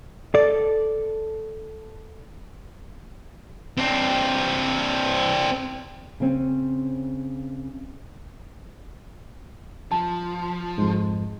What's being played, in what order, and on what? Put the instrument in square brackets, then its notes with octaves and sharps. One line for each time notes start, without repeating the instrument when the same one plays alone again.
[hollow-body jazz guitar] A4 D5
[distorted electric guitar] C4 D4
[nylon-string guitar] C#3 C4 C#4
[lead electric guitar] F3 [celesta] A5
[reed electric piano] F2 G#2 [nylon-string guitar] G#3